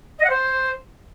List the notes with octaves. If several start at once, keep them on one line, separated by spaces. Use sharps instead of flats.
D#5
F#5
C5